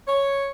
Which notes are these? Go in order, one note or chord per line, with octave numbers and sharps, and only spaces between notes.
C#5